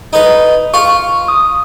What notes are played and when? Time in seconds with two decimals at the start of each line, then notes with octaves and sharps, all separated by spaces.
0.13 D#4 B4
0.74 F4 C#6
1.28 D#6